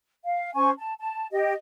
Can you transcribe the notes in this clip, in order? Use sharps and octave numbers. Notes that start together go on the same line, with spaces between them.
F5
C#4 C5 G#5 C#6
A5
A5
G4 D#5